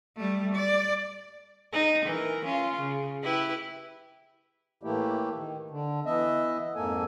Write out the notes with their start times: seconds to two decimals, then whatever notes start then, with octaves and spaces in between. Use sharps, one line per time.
0.17 G3 A3
0.55 D5
1.72 D#4
2.05 E3 A#4
2.45 C#4 F4
2.79 C#3
3.23 E4 G4 B4
4.83 A2 E3 A3 A#3 E4 G4
5.34 D#3
5.71 D3
6.05 E3 B3 D#5 E5
6.75 F2 G#2 A#3 A4 G#5